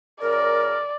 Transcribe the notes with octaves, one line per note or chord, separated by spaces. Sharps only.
F#2 C#3 A#4 D5